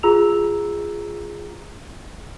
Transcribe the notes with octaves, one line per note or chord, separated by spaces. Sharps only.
F4 G#4 A#5 E6 F7